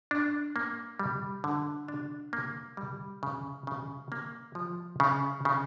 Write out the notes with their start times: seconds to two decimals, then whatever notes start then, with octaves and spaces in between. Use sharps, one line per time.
0.11 D4
0.56 A#3
0.99 G3
1.44 D3
1.88 D4
2.33 A#3
2.77 G3
3.23 C#3
3.67 C#3
4.12 A#3
4.55 F3
5.00 C#3
5.45 C#3